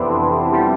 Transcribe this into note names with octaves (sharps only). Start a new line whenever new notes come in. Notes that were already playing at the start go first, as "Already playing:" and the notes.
Already playing: F2 C3 E3 B3 C4 D4 E4
G3